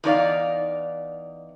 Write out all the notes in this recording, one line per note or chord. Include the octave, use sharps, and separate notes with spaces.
E2 D#4 D5 F5